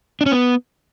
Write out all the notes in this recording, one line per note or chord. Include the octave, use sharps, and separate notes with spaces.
D4
C#4
B3